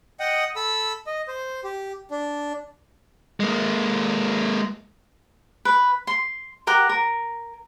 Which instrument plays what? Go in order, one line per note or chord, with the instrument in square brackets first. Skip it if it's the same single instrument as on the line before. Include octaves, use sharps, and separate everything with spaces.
[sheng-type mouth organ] D#5 F#5 G5 D#6
A4 B5 E6
D#5
C5
G4
D4
[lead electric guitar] G#3 A#3
[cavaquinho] B4
C6
G4 A#4 F#5 G5
A#4